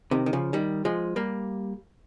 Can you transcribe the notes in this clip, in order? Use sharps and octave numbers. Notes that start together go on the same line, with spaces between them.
C3 D#3
D#3
C#3 F3
D#3 G3
F3 G#3
G3 A#3